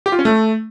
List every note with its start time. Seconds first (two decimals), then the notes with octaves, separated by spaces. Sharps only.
0.06 G4
0.12 F4
0.19 C#4
0.25 A3